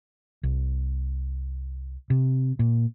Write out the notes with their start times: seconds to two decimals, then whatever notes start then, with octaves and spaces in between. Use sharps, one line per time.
0.43 C2
2.10 C3
2.59 A#2